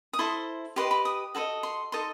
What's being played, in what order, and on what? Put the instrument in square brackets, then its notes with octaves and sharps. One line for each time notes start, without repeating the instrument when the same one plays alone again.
[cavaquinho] D#6
E4 A4 C5 C6
G4 B4 D#5 C6
B5
D#6
F#4 A4 C5 D#5
C6
D#4 A4 D#5 C6